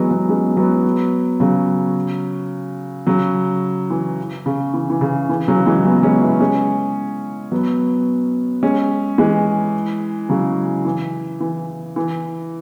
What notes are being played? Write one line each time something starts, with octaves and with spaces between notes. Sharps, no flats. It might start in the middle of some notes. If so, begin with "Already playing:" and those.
Already playing: E3 F#3 G#3 B3
F#3 B3
G#3 C#4
F#3 B3
C#3 F#3
C#3 F#3
E3
C#3
E3
E3
C#3
E3
C#3 F#3
E3 G#3
F#3 B3
G#3 C#4
B3 E4
G#3 C#4
F#3 B3
G#3 C#4
E3 G#3
C#3 F#3
E3
E3
E3